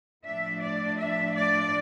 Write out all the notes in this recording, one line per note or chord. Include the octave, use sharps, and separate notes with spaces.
A2 F3 A3 D4 E5
D5
E5
D5